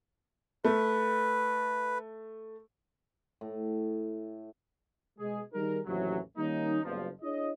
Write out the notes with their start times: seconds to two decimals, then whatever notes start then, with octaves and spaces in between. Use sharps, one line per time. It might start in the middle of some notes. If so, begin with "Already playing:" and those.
0.65 A3 B4
3.41 A2
5.19 B2 G#3 G#4
5.54 D#3 G3 D#4 G#4 A#4
5.85 A1 D#2 C3 E3 F#3
6.37 D#3 G3 A#3 C#4 D#4
6.84 F#1 G2 B2 F3
7.21 D4 E4 G#4 C#5 D#5